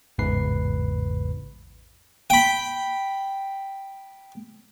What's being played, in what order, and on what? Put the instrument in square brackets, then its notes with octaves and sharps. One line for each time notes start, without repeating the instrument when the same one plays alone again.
[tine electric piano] A1 E2 G#2 C#3 B4 C7
[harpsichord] G5 B5